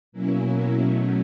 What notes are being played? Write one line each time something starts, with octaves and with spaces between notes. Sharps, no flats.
B2 F#3 A#3 C#4 E4
B2 F#3 A3 C#4